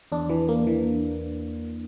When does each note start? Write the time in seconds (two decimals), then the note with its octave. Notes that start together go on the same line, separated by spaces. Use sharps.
0.12 E2 D4
0.29 E3
0.49 A#3
0.67 E3